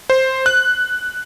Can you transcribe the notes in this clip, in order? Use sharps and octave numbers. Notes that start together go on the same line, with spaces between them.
C5
F#6